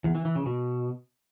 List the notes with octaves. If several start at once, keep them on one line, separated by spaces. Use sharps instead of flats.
E2
E3
E3
C#3
B2